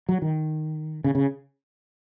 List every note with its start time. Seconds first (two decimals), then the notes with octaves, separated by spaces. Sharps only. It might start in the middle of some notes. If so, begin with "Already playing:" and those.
0.09 F#3
0.22 D#3
1.04 C#3
1.15 C#3